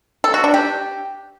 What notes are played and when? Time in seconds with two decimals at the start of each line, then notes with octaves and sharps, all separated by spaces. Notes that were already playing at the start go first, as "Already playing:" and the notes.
0.24 A4
0.34 F#4
0.44 D4
0.54 G4